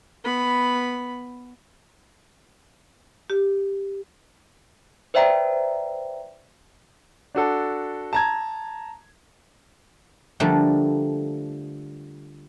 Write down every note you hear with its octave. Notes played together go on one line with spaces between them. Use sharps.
B3 B5
G4
B4 C5 D5 E5 G5 A#5
D4 F#4 A4
A5 A#5 G#6
D3 F3 G3 A3 A#3